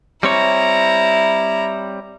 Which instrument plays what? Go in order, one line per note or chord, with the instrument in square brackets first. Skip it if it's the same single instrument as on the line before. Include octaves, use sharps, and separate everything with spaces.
[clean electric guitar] G3 C4 C#5 [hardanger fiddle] E4 A#5